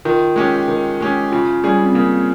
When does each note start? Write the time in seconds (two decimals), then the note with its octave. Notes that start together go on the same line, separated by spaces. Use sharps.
0.05 D#3 F4
0.36 G#3 C#4 G4
0.68 D#3
1.01 G#3 C#4 G4
1.32 C#3 F4
1.64 G3 C#4 G#4
1.84 C4
1.95 C#3 A#3